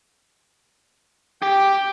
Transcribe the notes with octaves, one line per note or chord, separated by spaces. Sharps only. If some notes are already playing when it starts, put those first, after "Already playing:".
G4 G5